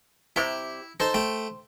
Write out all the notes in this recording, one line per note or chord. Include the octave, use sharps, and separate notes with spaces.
C3 G3 E4 G4
D#4 A4 C5
A3 G5